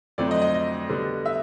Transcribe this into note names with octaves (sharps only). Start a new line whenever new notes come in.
F2 D3 F#3 A3 C4 D5
D#5
D#5
D#5
D3 G3 B3 D4
E5